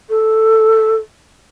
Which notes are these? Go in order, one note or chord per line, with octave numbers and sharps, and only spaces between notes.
A4